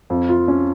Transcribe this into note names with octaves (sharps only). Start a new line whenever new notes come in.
F2
F4
C#4